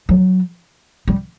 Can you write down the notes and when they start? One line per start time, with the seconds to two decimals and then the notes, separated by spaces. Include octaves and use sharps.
0.09 F#3
1.08 G3